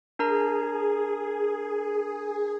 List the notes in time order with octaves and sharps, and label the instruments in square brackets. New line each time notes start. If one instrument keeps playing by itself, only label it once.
[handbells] D4 A#4 A#5 [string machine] G#4